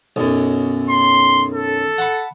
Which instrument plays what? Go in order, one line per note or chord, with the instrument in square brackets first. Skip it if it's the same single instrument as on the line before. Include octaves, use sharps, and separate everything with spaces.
[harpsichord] B1 F#2
[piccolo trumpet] C6
A4
[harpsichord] F#5 A5 B5